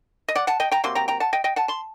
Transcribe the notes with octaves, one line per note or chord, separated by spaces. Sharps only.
D#5
D5 F#5
F#5 A5
D#5 G5
G5 A#5
C3 F#3 A#3 C6
G5 A#5
G5 A#5
F#5 A5
D#5 G5
D#5 G5
F#5 A5
A5 C6